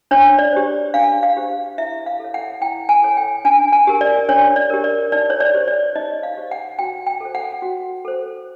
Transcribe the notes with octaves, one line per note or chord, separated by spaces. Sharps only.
D4 C#5
D5
G4 C5
D4 F5
F5
G4 C5
E4 E5
F5
A4 C#5
F#5
E4 G5
G#5
A4 C#5
G5
D4 G#5
G#5
G4 A#4
D5
D4 C#5
D5
G4 A#4
D5
D#4 D5
C#5
D5
G4 C5
D5
D#4 D#5
F5
G4 C5
F#5
F#4 G5
G5
A4 C5
F#5
F#4
A4 C5